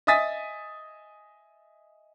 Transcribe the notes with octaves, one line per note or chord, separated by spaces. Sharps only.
D#5 E5 G#5 D#6 A6 B6